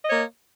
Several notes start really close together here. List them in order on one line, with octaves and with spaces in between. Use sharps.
D#5 C#5 A#3